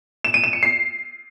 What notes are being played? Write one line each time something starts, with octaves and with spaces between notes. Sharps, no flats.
E7
D#7
E7
C#7
C7